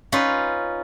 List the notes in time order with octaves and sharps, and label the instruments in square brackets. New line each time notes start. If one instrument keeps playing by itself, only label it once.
[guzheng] C#4 D#4 F4 B4